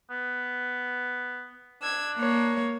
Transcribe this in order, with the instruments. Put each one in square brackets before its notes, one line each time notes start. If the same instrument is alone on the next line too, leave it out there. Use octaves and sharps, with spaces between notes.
[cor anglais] B3
[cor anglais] D4 [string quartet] E6 G#6
[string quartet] A#3 C#5